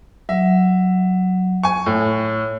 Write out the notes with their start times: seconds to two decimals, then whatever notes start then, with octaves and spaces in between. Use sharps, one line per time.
0.29 F#3 E5
1.63 G#5 C#6
1.86 A2 C#5